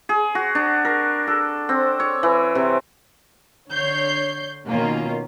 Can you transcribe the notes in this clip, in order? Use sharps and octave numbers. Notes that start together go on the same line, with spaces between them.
G#4
F#4
D4
A#4
A4
C4
C#5
E3
C3
D3 C#5 G6 C7
B2 D#3 A#3 C#4 F4